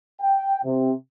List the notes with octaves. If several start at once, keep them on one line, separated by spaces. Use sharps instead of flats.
G5
C3